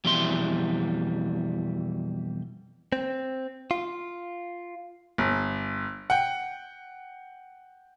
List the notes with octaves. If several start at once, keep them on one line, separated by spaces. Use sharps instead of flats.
F2 B2 E3 G3 E4 C6
C4
F4
G1
F#5 G5